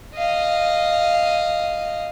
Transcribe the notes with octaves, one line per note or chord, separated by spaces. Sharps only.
D#5 F5